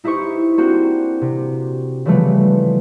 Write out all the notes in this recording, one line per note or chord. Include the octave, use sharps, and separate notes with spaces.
D#4 E4 G4 C5 C#6
A#3 C4 D4 F#4 G4 C5
C3
C#3 E3 F3 G3 A3 B3